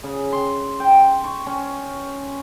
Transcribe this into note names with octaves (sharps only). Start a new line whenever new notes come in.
C#3
C6
G5
C#6
C#4